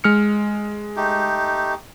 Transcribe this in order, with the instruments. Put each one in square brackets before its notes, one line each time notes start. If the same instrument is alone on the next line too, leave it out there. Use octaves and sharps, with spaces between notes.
[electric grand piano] G#3 F6 C#7
[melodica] A3 D#4 G4